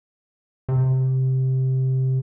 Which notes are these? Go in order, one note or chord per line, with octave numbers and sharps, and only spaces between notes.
C3